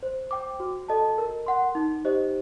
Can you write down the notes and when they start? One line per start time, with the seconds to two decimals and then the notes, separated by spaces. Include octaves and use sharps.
0.03 C5
0.31 G5 D6
0.60 F#4
0.88 A4 D#5 A5
1.18 A#4
1.47 F#5 C6
1.75 D#4
2.05 G4 C5 D#5